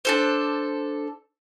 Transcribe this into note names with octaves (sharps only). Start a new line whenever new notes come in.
D4 A4 C5